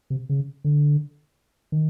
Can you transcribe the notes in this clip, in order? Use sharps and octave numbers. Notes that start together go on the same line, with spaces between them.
C3
C#3
D3
D#3